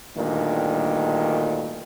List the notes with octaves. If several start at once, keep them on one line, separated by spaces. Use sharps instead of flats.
D2 G2 A#2 D#3